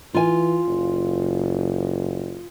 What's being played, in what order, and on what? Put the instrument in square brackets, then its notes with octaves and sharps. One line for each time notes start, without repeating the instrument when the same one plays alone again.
[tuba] E3 [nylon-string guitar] F4 G#5
[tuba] F#1